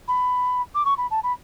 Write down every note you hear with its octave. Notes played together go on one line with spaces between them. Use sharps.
B5
D6
C#6
B5
A5
B5